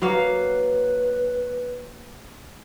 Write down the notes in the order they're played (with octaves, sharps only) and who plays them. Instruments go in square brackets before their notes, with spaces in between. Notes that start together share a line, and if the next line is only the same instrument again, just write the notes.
[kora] F#3 A#3 F5 [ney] B4